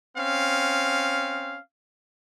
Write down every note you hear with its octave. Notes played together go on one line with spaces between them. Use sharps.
C4 C#4 F5